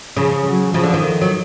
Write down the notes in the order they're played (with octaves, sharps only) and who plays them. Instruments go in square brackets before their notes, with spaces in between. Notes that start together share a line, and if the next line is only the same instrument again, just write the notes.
[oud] C#3 [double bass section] F3
[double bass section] F#3
[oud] C#3 [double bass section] F3
[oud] D3
D#3
F#3